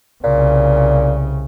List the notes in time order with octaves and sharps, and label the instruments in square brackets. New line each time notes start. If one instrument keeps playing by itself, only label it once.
[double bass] C2 C#3 [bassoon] A#2